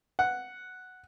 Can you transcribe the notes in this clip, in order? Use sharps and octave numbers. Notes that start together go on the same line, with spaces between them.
F#5